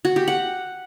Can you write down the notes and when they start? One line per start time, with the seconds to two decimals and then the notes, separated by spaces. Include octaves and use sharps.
0.05 F#4
0.16 G4
0.28 F#5